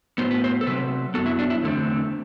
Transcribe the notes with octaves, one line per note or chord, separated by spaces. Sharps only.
A2 F#3 B3 C5
B4
C5
A4
C3 F#3 C4 B4
F#2 F#3 B3 A4
E4
D4
E4
E2 D3 A3 C4